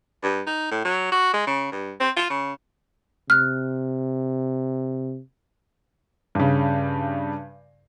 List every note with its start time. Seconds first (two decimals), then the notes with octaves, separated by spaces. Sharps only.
0.23 G2
0.47 D#4
0.71 A2
0.85 F#3
1.12 F#4
1.33 G#3
1.47 C#3
1.72 G2
2.00 C4
2.16 F4
2.30 C#3
3.30 C3 F6 F#6
6.35 G2 C#3